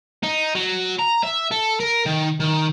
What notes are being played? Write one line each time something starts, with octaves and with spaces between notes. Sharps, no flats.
D#4
F#3
A#5
E5
A4
A#4
D#3
D#3